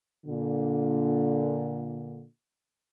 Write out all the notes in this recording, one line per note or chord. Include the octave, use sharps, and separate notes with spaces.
A#2 D3